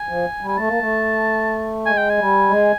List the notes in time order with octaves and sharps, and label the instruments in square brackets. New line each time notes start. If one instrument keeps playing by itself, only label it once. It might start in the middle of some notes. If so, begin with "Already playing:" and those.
Already playing: [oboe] G#5
[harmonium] F3
G3
[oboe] G#5
[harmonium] A3 [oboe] A5
[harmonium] A#3
A3
[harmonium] G#3 [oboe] G#5
[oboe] G5
G#5
[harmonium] G3
G#3